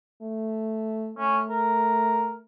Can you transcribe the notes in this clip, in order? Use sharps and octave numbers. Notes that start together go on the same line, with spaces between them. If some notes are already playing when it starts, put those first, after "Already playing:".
A3
A3 C#4
A#4